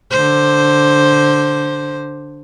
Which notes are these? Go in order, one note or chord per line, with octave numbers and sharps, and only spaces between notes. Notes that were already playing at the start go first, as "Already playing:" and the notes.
D3 C5